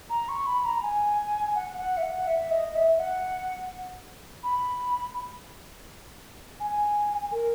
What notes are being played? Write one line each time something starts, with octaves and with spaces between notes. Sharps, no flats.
A#5
C#6
B5
A#5
G#5
F#5
F#5
E5
F#5
E5
D#5
E5
F#5
B5
G#5
A#4